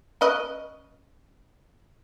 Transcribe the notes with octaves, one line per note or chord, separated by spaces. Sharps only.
C#4 B4 D#5